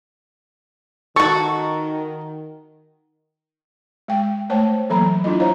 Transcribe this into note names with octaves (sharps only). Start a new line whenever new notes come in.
D#3 F#4 A4 C#6
G#3 G5
A3 C5 C#5 G5 A5
E3 F#3 A#3 A4 A#5 B5
D4 E4 F4 D#5
C5 C#5 D#5 F5 A#5